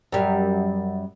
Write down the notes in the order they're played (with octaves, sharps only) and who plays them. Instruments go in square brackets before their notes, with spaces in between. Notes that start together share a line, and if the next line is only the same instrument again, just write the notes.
[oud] F#2 G3